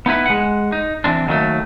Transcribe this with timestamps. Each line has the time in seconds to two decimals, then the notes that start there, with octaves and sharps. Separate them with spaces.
0.06 B3 D#4 E4 B4
0.26 G#3 F#5
0.72 D#4
1.04 E3 C4 D4
1.27 D#2 D#3 F#3 A3